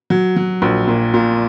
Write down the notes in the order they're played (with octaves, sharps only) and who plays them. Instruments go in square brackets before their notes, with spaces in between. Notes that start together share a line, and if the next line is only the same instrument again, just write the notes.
[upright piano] F#3
F#3
A#1
A#2
A#2